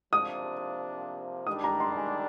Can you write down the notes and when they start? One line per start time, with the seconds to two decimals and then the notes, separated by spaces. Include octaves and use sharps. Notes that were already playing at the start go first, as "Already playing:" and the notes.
0.13 C3 F3 A#3 D4 D#6
1.47 D#3 G3 D4 D#6
1.64 A#5
1.80 C6
1.97 G#5